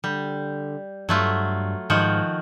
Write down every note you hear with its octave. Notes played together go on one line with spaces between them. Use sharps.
D3 G3
G2 F#3 A3 F4
G#2 D#3 F3 F#4